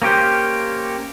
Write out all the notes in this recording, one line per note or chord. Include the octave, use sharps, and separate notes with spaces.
A#3 C#4 G4 C5